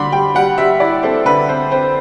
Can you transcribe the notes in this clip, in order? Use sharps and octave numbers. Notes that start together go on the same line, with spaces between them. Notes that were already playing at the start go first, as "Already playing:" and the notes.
Already playing: D3 G3 B5 C6 D6
G3 G5
G3 F#5
G3 E5
E4 D5
C4 A4
D3 B4
C4 C5
C4 C5